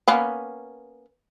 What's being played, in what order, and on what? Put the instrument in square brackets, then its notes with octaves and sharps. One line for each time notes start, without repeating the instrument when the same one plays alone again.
[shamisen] A#3 B3 C#4